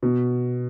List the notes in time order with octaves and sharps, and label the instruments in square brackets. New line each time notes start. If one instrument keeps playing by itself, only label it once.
[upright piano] B2